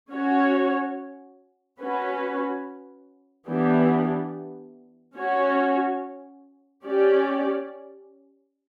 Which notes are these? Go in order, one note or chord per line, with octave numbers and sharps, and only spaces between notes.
C#4 F#4 C#5
C#4 F#4 B4
E3 B3 D4 G4
C#4 F#4 C#5
C#4 G4 D5